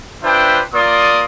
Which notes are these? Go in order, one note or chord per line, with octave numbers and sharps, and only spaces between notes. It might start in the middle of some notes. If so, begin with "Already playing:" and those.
D4 F4 B4 C5 E5 G5
A#3 F4 D5 C6 D#6